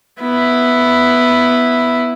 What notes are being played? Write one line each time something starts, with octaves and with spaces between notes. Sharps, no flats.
B3 E4